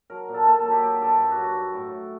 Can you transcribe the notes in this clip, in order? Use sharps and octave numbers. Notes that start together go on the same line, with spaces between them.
F#3 A#4
A#2
A4
A#2 A4
A4
F#3
G4
F#3 G4
G2 A4
G2
F#4
F#3
F#4
G3
A2
A2